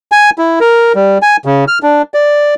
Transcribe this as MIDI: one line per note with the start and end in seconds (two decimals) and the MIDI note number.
0.12 0.30 80
0.38 0.59 64
0.60 0.93 70
0.95 1.18 55
1.22 1.37 80
1.45 1.65 49
1.68 1.79 89
1.83 2.02 62
2.14 2.55 74